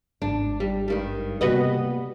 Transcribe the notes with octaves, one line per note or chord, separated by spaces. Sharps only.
G#1 D4
G3
G2 D#3 G3
C3 G3 A#3 B3 F#4 B4 D#5